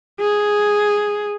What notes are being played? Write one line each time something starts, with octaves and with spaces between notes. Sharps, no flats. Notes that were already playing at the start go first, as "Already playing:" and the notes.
G#4